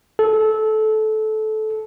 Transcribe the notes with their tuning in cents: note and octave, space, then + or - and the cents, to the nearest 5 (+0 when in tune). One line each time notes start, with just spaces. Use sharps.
A4 -20